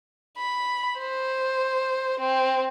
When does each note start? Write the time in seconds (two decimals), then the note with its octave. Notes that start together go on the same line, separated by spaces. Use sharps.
0.37 B5
0.99 C5
2.19 C4